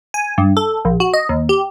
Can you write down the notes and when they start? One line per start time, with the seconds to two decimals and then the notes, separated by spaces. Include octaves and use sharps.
0.14 G#5
0.38 G2
0.57 A4
0.85 A#1
1.00 F#4
1.14 D#5
1.29 D#2
1.49 G4